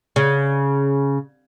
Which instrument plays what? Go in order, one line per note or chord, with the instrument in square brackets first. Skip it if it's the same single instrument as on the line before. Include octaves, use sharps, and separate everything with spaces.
[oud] C#3